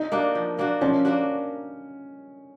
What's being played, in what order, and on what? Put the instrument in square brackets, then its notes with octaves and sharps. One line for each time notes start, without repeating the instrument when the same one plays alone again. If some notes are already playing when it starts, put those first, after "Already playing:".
Already playing: [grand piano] D#4
[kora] A#3 D4 F#4
F3
A#3 D4 F#4
[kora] F3 [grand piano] C#4
[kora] A#3 D4 F#4